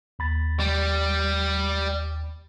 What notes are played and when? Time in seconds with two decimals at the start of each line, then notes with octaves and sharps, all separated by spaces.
0.19 D#2 B5 A6
0.60 G3